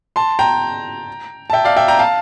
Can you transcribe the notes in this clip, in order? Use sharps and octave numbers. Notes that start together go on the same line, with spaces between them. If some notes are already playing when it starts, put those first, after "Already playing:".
A5 C6
G5 A#5
A5
E5 G5
D5 F5
E5 G5
G5 A#5
F5 A5